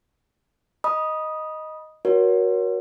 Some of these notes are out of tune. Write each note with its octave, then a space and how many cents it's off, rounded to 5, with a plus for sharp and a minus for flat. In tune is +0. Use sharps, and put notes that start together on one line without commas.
D#5 +0 B5 -30 D#6 +0
F#4 +0 A#4 +35 C#5 +15